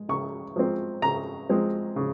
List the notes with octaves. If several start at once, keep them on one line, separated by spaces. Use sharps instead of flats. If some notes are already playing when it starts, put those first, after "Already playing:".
Already playing: G#3
C#3 C#6
F3 G#3 C4
C#3 A#5
F3 G#3 C4
C#3